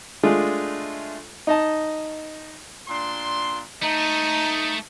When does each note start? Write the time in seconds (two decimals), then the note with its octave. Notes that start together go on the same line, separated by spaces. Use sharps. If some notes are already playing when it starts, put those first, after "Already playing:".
0.23 G#3 A3 D4 F4 G#4
1.47 D#4 D#5 A5
2.89 A#2 D4 C6
3.83 A3 D#4